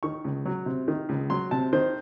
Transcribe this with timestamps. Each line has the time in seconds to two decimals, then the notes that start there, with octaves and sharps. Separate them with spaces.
0.03 D#3 C#6
0.24 C#2
0.46 F#3
0.66 C3
0.88 D#3
1.09 C#2
1.30 F#3 C6
1.51 C3 A5
1.73 D#3 C5